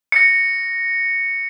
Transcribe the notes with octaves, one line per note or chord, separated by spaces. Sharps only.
A#6 C#7